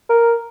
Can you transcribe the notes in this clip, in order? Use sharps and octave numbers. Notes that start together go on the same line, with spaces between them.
A#4